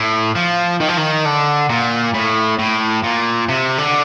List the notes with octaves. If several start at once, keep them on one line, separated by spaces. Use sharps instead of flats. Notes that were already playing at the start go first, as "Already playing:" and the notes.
Already playing: A2
F3
D#3
F3
D#3
D3
A#2
A2
A2
A#2
C3
D3